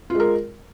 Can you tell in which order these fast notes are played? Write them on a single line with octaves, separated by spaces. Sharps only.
F4 G#3 A#4